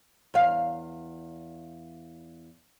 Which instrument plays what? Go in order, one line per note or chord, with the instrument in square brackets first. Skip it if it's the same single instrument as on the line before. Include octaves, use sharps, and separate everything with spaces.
[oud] E2 F5